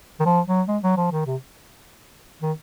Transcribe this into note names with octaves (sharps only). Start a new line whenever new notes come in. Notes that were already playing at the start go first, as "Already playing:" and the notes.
D#3
F3
F#3
G#3
F#3
F3
D#3
C3
D#3